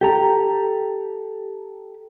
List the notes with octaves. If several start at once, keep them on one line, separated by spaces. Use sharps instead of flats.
G4 A4 A#5